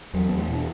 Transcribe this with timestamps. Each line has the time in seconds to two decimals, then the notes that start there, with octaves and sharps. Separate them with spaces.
0.13 E2 F#3
0.29 E2 B3
0.37 A3
0.49 B2
0.54 D4